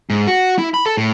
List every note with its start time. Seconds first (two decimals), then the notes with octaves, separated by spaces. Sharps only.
0.10 G#2
0.27 F#4
0.58 E4
0.74 B5
0.86 A4
0.97 A2